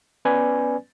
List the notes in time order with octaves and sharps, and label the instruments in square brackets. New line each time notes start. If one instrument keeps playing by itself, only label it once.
[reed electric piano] B3 C#4 B4 D5 G#5